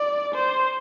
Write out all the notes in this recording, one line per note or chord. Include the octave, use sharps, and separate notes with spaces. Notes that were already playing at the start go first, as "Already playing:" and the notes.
Already playing: D5
C5